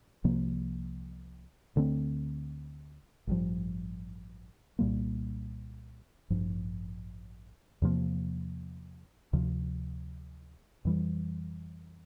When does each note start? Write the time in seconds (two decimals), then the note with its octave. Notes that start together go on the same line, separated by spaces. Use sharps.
0.24 C2 C3 F3 A#3
1.76 D2 D3 A3 C4
3.27 A1 G2 F3
4.79 C2 A#2 G3 A#3
6.30 A1 G2 F3
7.82 E2 C3 F3 A#3
9.33 D2 C3 F3
10.85 F2 E3 G3